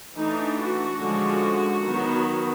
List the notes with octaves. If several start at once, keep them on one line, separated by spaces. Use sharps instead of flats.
E3 A3 D4 D#4
F#4
D3 F3 G#3 C#4
D#3 F#3 B3